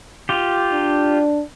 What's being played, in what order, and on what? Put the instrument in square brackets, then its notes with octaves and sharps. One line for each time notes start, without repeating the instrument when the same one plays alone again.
[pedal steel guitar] F4 G4
[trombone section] D4